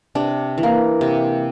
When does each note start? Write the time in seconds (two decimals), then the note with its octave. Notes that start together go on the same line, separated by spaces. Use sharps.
0.15 C3 D4
0.58 E3
0.63 A#3
1.01 C3